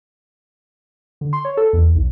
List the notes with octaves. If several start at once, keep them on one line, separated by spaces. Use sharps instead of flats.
D3
C6
C#5
A4
E2
B1